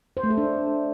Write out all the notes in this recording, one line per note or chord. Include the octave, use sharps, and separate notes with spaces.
C5
A3
A4
D4